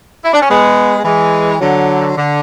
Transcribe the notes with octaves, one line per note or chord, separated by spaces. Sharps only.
E4
D4
C#4
G#3 B3
E3 G#3
D3 F#3
D3